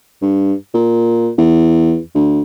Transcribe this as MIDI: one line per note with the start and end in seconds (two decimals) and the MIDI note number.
0.22 0.53 43
0.74 1.30 46
1.38 1.99 40
2.15 2.42 38